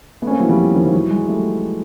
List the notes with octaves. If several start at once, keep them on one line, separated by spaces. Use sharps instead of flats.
A3 B3
C#4
A#3 C4
E3 F#3
F3 G3
E3 F#3
D#3 F3
F3
E3 F#3
F#3 G#3
G3 A3